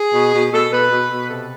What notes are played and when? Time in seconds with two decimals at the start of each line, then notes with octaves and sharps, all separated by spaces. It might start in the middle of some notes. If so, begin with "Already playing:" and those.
Already playing: G#4
0.13 B2
0.32 B2
0.52 B2 A4
0.71 B2 B4
0.91 B2
1.11 B2
1.29 C3 A4